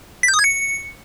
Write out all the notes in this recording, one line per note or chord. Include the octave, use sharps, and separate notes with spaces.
B6
G6
D#6
G#6
C#7